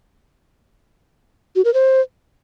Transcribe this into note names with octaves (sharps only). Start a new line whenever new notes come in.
F#4
A#4
C5